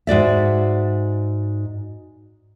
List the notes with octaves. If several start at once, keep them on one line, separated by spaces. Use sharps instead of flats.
G#2 F#4 D5 E5